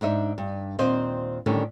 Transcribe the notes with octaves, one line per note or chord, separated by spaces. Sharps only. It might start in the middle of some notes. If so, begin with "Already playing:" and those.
G#2 D4 D#4 E5
G2
D#2 A#2 C4 C5 D#5
A2 D3 D#3 G3 C#4